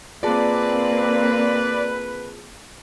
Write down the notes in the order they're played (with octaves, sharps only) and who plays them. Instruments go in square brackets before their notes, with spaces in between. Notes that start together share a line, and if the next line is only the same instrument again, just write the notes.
[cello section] A#3 C4 [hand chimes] F4 G#4 A5 [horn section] B4 [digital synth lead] D5